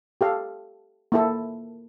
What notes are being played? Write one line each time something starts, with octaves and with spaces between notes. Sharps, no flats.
G4 A4 F5
A#3 E4 A4